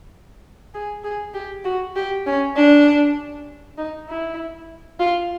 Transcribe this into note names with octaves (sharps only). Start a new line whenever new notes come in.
G#4
G#4
G4
F#4
G4
C#4
D4
D#4
E4
F4